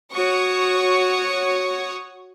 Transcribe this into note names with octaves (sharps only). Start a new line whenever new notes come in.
F#4 C#5 C#6 D#6